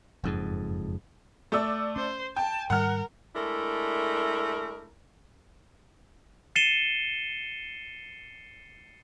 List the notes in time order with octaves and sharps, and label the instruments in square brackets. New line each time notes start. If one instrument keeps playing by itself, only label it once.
[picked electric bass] F#1 F2 G#2
[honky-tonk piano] A3 D5 E6
[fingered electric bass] C#4 [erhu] C5
[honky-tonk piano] G5 [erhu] A5
[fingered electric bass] G#2 D#3 G3 [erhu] A#4 [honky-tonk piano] F#5 F6
[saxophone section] G#3 A3 D4 E4 A#4
[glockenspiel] A6 C7 C#7 D#7 E7 G7